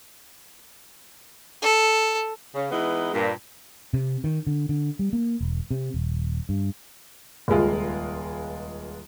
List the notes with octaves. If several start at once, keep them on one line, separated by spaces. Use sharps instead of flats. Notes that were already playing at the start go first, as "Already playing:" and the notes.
A4
C#3
E3 G#3 B3 D#4
G2 A#2
C3
D#3
D3
D3
G3
A#3
E1
C3
D#1
G2
D#1 C#2 G#3 F4